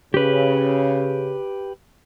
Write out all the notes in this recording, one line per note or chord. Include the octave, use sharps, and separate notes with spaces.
C#3 G4 B4